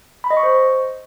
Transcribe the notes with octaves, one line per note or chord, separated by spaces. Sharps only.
B5
D#5
C#6
C5